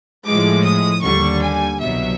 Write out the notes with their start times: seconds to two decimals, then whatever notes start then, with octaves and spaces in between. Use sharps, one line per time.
0.25 A2 F3 G#3 D6
0.64 D#6
1.02 D#2 D3 G3 C#6
1.42 G#5
1.80 C2 B2 F#3 E5